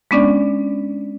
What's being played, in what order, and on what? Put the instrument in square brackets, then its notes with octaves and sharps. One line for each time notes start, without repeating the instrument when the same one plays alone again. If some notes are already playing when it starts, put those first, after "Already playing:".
[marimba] G#3 B3 C#4 D4 D5